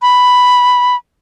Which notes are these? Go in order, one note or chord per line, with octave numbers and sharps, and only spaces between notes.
B5